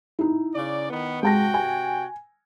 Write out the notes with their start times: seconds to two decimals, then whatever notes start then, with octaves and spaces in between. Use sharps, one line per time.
0.19 D#4 E4
0.54 C#3 D5
0.90 D#3 B3
1.23 C3 G#3 F#4 G5 A5 A#6
1.54 G#5